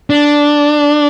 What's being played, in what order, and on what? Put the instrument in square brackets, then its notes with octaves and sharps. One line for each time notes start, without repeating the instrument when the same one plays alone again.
[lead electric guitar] D4